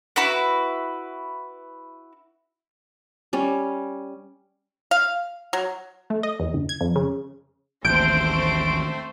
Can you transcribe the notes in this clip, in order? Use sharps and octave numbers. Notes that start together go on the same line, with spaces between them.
E4 F#4 B4
G3 C#4
F5
F#3
A3
D#5
E2
G1
G#6
F2
C#3
A1 D#2 A3 C4 C5 G6 D7